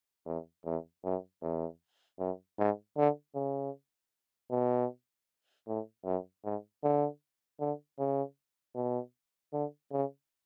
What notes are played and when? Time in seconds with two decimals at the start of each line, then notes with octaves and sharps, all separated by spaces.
0.26 E2
0.65 E2
1.04 F#2
1.42 E2
2.19 F#2
2.59 G#2
2.97 D3
3.35 C#3
4.51 B2
5.68 A2
6.05 F#2
6.44 G#2
6.83 D3
7.60 D3
7.99 C#3
8.75 B2
9.53 D3
9.92 C#3